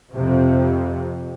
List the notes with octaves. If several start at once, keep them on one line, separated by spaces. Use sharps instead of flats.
F2 C3